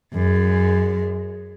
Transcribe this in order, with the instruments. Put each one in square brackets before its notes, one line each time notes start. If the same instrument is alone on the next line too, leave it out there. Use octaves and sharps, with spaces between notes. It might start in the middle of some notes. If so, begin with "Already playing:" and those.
[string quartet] F#2 G#3